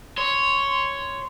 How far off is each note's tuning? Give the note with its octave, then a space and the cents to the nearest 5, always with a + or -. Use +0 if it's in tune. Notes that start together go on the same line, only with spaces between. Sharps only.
C#5 +0 C6 -10